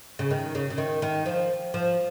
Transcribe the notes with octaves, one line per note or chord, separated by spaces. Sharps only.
C#3
D#3
C#3
C#3
D#3
D#3
F3
F3